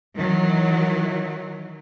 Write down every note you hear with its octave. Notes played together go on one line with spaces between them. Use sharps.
D#3 E3 F#3